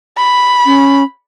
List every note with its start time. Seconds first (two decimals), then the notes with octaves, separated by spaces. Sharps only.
0.18 B5
0.66 C#4